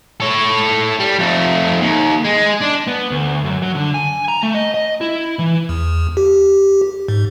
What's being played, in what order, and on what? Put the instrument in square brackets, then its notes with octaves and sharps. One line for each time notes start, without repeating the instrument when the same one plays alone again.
[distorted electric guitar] A4 C#5
G3
F2 A3
D#2
G#3
D4
[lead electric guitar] B3
D2
F#2
F#3
D3
G#5
A#5
A3
D#5
D#5
E4
E3
[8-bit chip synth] E2
G4
G#2